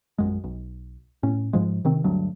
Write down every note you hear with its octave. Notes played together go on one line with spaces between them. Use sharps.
A#1 F#2 G#3
B1
A2 C#4
G#2 F3 G#3
C3 D#3 C4
D2 G2 F#3